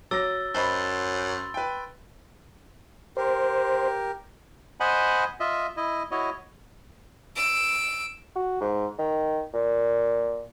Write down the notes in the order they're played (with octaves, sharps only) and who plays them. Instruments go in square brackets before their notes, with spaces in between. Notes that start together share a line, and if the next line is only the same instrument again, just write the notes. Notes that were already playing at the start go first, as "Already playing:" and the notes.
[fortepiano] F#3 [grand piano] D6 A#6 [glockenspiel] E6 A6 G7
[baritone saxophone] F#2 [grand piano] C5 D#5 B5 [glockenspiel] C6 A6 G7
[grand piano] B4 G5
[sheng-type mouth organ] G4 A#4 [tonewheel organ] C5
[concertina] C5 D#5 F#5 G#5 B5
F4 D#5 E5
E4 D#5
E4 F#4 C#5 D#5
[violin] E6 D7
[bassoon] F#4
G#2
D#3
A#2